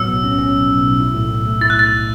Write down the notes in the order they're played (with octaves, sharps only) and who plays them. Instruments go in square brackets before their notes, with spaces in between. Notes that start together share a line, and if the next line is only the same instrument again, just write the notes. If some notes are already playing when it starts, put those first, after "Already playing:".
Already playing: [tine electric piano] A2 F#3 B3 [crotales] E6
[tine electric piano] B1
C#4
C#4
B1
B1
B1
E4
A2
A2
A3
[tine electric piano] E4 [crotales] A6
[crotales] F#6
[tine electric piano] A3 [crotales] A6
[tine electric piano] A2